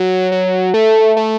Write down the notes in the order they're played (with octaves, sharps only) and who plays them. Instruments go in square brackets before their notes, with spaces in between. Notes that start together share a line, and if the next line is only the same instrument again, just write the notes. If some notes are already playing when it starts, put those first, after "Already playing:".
Already playing: [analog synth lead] F#3
F#3
A3
A3